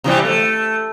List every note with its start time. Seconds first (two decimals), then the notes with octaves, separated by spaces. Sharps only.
0.04 C3 E3 G3
0.25 A3